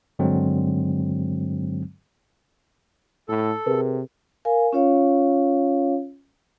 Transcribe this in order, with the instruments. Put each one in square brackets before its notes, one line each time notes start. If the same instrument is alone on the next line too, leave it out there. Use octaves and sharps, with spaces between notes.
[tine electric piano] G2 D3 F#3 G#3 C4
[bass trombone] A2 [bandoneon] A4
[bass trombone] C3 [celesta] G#4 A#4 B4
[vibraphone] A#4 F5 G#5
C#4 F4 C#5 F5